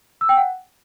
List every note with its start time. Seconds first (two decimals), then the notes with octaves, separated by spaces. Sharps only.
0.21 E6
0.29 G5
0.37 F#5